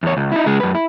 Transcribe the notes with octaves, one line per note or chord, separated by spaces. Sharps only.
E2 C#5
C#2
D#4 E4
C#3 G#3
F#2 B4
E4